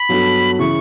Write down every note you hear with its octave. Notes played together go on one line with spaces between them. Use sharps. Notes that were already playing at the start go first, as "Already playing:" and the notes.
Already playing: B5
G2 F#3 B3 F#4 A4
C#3 E3 C#6